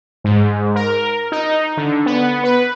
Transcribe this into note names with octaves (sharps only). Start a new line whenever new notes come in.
G#2
A#4
D#4
D3
B3
B4